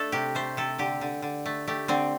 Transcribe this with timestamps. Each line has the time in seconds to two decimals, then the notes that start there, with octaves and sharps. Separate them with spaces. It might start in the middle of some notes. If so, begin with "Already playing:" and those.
Already playing: A3 D4 A4
0.12 C3 G4
0.35 A3 C5
0.57 C3 A4
0.78 D3 G4
1.01 D3
1.22 D3
1.46 A3
1.67 A3 G4
1.88 D3 C4